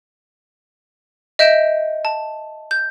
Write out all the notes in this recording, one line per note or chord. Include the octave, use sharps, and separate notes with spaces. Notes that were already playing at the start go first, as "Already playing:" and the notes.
D#5 E5 G6 D7 E7
A5
G6